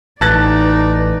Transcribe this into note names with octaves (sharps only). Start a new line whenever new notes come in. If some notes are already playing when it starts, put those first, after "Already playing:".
A1 D#4 B4 D5 A5 F#6 A6